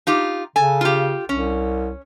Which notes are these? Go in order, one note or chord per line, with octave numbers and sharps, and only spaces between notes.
D#4 F4 G4
C#3 A4 G#5
F4 G4
C2 C#4